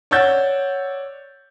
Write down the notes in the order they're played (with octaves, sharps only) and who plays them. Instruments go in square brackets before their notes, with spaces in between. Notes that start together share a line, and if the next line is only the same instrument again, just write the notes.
[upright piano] C#5 D5 F#5 E6 G6 A6